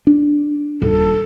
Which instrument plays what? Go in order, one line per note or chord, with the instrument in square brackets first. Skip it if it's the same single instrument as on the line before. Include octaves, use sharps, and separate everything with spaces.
[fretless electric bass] D4
[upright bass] D#1 [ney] A4